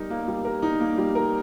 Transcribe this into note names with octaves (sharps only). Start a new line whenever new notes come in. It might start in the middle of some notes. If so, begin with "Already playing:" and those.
Already playing: G3 D#4 A#4
A#3
G3
A#4
D#4
A#3
G3
A#4